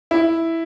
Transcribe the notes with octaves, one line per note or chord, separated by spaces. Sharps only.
E4